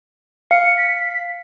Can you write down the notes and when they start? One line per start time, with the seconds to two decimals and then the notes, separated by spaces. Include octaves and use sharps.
0.51 F5 C#7
0.77 B6